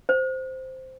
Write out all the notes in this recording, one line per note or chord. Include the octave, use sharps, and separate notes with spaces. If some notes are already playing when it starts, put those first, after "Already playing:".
C5